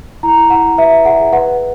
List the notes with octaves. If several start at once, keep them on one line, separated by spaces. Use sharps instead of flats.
E4 A#5
E4 F#5
B4 E5
G#4 F#5
B4 F#5